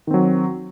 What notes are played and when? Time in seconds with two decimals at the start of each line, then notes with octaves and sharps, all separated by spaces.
0.07 D#3
0.11 C4
0.14 F#3